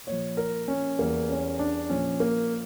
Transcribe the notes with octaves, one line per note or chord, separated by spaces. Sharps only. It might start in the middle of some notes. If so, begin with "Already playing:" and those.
A#2 F3 C#5
A#4
C#4
E2 E3 G3 A#3
C#4
D4
A#2 F3 C#4
A#3